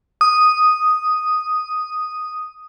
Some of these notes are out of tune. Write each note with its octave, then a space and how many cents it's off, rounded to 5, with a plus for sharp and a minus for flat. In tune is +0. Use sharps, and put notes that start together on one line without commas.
D#6 -5